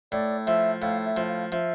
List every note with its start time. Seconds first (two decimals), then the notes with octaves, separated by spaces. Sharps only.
0.12 A2 D5
0.47 F3 E5
0.81 A2 F5
1.06 E5
1.17 F3
1.28 F5
1.52 F3 E5